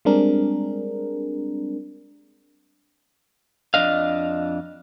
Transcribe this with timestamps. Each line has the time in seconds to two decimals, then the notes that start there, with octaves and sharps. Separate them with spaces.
0.05 G3 G#3 C4 D4 G#4 A#4
3.74 F2 G#2 D4 D#5 F5